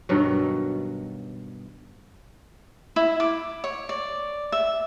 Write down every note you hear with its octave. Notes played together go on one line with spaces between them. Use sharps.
G2 B2 D#3 F#3
E4
D6
C#5
D5
E5